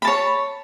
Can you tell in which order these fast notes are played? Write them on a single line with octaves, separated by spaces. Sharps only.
B5 A5 C#5